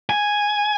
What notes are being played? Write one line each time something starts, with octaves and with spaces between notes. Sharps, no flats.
G#5